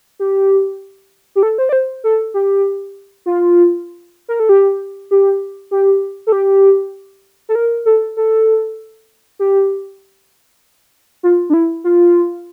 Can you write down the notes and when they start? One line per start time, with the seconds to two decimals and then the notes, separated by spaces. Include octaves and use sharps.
0.19 G4
1.35 G4
1.43 A4
1.58 C5
1.69 D5
1.73 C5
2.04 A4
2.34 G4
3.26 F4
4.29 A#4
4.40 A4
4.49 G4
5.11 G4
5.71 G4
6.27 A4
6.32 G4
7.49 A4
7.55 A#4
7.86 A4
8.17 A4
9.39 G4
11.23 F4
11.50 D4
11.54 E4
11.84 F4